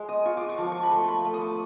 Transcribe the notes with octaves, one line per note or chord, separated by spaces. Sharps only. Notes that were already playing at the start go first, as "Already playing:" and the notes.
Already playing: G#3
D#6
F4 C#6
D6
C#6
F3 D6
C#6
B5
A3 C6
B5
A3
D#6
D6